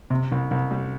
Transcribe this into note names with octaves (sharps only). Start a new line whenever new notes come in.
C3
C2
C2
G3